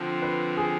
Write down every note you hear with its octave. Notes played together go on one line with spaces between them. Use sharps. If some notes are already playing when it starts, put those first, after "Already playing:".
Already playing: D3 F3 C4
B4
G#4